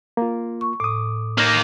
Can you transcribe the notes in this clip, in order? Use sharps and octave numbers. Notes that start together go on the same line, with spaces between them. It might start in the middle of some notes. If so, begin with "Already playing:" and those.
A#3 F4
C#6
A2 D6 D#6
A#3 D#4